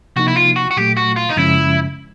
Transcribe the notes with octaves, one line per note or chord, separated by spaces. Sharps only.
C3 F3 A#3 D#4 F#4
E4
F4
F#4
F#4
A#2 F#3 A3 G4
F#4
F4
D#4
F#2 C#3 F3 G#3 C#4 E4